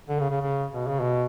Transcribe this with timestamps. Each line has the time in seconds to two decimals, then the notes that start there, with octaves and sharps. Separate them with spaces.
0.09 D3
0.20 C#3
0.30 C#3
0.41 C#3
0.73 B2
0.87 C#3
1.01 B2